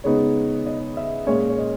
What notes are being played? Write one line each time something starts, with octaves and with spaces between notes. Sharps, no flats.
C#3 G#3 B3 D#4 C#5
D#5
E5
A#2 G#3 C#4 C#5
C#5
D#5